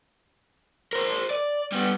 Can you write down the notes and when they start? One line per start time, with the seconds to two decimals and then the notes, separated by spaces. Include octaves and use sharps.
0.93 A#4 C5
1.30 D5
1.72 G3 B3